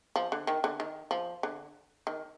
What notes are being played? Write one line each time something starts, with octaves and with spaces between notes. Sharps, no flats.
F3
D3
D#3
D3
D#3
F3
D3
D#3